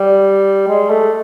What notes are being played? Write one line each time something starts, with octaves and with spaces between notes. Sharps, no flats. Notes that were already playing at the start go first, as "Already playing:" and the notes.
Already playing: G3
G#3
A3